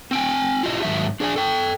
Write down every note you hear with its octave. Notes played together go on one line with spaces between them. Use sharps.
C4 G5 G#5
E4 F4 G4 D#5
G#2 D#3 E3 F#3 E5
D4 G#4 D5 G#5
A4 G5